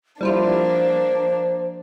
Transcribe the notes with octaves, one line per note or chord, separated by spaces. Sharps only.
F3 G3 A#3 D4 E4 F4 C5